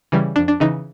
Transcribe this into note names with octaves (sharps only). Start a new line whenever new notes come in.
C#3 E3 G3
F2 D4
D4
C#3 E3 D#4